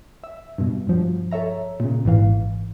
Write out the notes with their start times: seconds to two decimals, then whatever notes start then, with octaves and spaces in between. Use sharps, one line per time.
0.24 E5
0.58 G2 B2
0.87 G2 F3 F#3
1.31 A4 C#5 E5 A#5
1.80 A#2 C#3
2.05 G#1 G#2 E3 F5